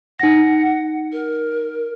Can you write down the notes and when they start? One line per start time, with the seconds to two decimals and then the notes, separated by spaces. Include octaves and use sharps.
0.19 D#4 F#5 A#6
1.12 A#4